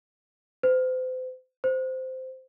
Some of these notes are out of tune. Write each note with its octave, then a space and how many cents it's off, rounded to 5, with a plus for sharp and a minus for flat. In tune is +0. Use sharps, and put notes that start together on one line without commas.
C5 -40
C5 -10